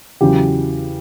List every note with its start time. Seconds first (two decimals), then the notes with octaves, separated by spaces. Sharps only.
0.21 E2 C#3 F#3 G4